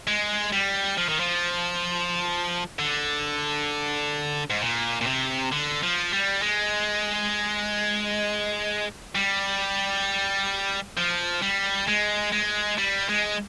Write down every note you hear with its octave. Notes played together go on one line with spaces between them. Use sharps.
G#3
G3
F3
D#3
F3
D3
G#2
A#2
A#2
C3
D3
F3
G3
G#3
G3
F3
G3
G#3
G#3
G3
G#3